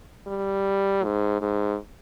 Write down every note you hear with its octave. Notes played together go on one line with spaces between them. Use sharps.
G3
G#2
G#2